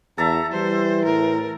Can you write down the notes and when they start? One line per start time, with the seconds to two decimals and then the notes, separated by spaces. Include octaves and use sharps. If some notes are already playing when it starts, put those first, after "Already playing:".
0.18 E2 A4 E5 A5 A#5
0.52 E3 G3 C5
1.05 A2 A#4